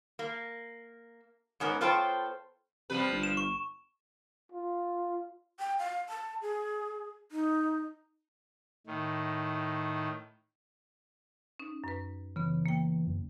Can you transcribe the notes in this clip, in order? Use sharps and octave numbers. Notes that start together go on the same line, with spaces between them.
A#3
G#2 B3 C#4 A#4
B3 F4 A4 C5 C#5 G5
C3 F3 G3 B4
G1
E7
C#6
F4
G5
F5
A5
G#4
D#4
A2 D#3
C#4 D#4
F#2 B4
C#3 E3 B3
A#3 G5
F#2